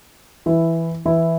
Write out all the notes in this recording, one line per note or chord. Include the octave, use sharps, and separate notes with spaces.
E3 E4
E3 E4